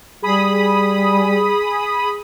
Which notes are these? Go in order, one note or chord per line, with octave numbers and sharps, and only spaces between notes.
G3 G#4 B5 D#6